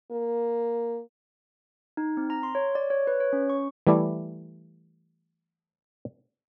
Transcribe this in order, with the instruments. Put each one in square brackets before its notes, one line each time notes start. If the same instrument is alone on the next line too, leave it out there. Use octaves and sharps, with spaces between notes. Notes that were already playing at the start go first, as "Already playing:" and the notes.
[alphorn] A#3
[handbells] D#4
C4
A#5
C6
C#5
D5
C#5
B4
C#5
C#4
C#6
[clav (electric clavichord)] E3 G3 A3 E4 D5